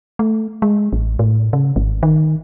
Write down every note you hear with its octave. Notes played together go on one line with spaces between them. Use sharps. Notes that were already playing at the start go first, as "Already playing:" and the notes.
A3
G#3
A1
A2
C#3
G#1
D#3